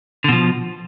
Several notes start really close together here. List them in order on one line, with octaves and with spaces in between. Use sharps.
D3 B2 F3